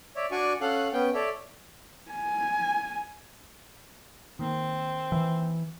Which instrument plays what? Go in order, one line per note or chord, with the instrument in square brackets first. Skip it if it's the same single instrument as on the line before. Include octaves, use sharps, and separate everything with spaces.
[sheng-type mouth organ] C#5 D5 E5
D4 F#4 D5 G#5 C#6
C#4 A4 F5 F#5 F#6
B3 C#4 G5
A4 C#5 D5 E5
[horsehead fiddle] G#5
[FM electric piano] D#3 A#3 [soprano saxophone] C4
[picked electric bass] E3